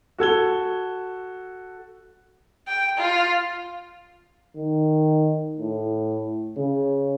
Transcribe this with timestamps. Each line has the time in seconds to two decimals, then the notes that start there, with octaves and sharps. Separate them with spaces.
0.18 F#4 A4 G#6 G7
2.68 G5
2.97 F4
4.57 D#3
5.57 A2
6.57 C#3